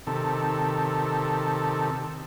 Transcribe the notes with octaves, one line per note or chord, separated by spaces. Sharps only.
C3 D#3 A4